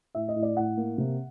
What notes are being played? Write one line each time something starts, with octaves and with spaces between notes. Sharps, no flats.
A2 E5
D#5
A2
D5
A2 F#5
A#3
C3